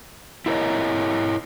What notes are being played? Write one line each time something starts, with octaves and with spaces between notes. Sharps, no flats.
E4 F4 A#4 B4 C#5 D#5